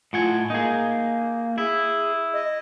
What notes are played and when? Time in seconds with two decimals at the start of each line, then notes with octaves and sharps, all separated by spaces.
0.13 A2 F4 F#5 G#5
0.50 A#3 D#4 G#4
1.58 E4 G#4
2.33 D#5